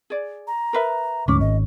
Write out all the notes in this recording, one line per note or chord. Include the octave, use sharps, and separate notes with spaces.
G#4 D5
A#5
A#4 B4 E5
D2 G#2 C#4 D6
G#1 D#5